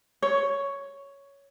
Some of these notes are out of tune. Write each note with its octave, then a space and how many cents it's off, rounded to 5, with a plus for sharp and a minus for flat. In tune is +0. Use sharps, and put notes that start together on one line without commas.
C#5 +5